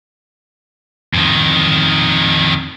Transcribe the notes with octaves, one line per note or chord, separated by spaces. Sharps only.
F2 D#3